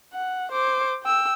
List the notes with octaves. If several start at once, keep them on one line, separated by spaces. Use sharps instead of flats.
F#5
C5 D6
G5 E6